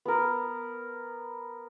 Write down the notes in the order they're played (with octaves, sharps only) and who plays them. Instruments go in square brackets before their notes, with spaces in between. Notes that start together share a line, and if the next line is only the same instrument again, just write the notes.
[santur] B3 A#4